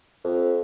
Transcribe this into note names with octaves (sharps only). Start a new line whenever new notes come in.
F2